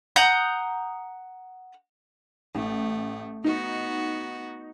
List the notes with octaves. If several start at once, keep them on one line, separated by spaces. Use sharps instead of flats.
F#5 A#5 D#6 G6
A1 A3
B3 D#4 F#4